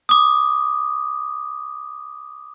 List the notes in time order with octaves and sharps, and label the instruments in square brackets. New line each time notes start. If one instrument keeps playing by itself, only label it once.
[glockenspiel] D6 D#6